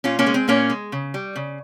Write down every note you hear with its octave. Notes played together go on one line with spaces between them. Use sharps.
A#2 C#4 F4
A#3 C#4
G#3
C4
A#2 A#3 C#4
G#3
C#3
G3
C#3